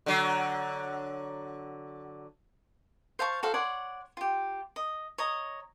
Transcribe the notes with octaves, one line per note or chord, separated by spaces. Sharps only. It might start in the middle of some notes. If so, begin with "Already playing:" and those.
D3 F#3
C5 F5 A5 C#6
F#4 A4 C5 F5
C#5 D5 F#5 C6
F4 G4
D#5
C#5 D#5 A#5